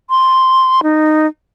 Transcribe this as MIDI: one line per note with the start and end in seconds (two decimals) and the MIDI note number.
0.10 0.81 84
0.83 1.27 63